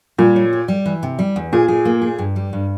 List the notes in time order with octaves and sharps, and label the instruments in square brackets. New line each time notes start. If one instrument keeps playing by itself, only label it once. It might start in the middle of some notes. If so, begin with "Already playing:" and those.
[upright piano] A#2 [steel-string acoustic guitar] G3
[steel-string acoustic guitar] C#5
G4
G3
E3
C3
G3
E2
[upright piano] A#2 [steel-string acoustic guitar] G#4
[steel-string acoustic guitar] G#4
A#3
G#4
G2
G3
G2